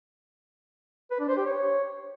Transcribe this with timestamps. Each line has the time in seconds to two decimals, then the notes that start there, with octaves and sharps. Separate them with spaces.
1.11 B4
1.19 D4
1.28 C5
1.37 G4
1.45 C#5